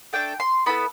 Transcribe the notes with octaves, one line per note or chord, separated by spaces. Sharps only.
A3 D4 A4 G5
C6
B3 E4 A4 B5